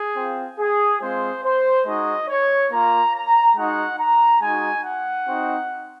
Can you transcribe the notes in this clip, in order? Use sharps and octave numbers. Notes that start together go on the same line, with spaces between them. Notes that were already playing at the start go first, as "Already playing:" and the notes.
Already playing: G#4
C4 F4
G#4
G#3 C4 F4 C5
C5
G#3 D#4 F#4 D#5
C#5
A#3 F4 A#5
A#5
G#3 D#4 F#4 F#5
A#5
G#3 D#4 F#4 G#5
F#5
C4 D#4 F#4